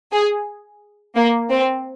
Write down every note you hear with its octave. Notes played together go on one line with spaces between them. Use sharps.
G#4
A#3
C4